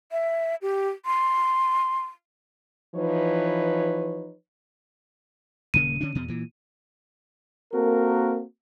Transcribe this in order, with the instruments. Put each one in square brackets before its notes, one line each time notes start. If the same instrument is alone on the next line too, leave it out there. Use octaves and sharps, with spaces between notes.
[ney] E5
G4
C6
[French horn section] E3 F3 D#4 B4 C#5
[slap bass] D#1 C#3 A#3 [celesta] D#7
[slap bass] D3 C#4 D4
E2 B2
A#2 E3
[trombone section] A#3 C4 F#4 A4 A#4